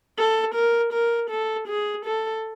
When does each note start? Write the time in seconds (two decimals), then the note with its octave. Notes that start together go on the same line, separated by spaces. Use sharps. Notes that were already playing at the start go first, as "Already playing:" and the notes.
0.18 A4
0.55 A#4
0.93 A#4
1.30 A4
1.68 G#4
2.05 A4